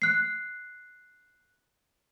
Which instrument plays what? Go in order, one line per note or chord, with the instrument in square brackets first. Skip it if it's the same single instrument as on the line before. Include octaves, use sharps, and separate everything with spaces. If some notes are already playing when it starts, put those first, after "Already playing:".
[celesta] F#6 C7